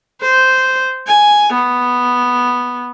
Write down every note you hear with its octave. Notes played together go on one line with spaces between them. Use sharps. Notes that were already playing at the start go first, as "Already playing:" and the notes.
C5
G#5
B3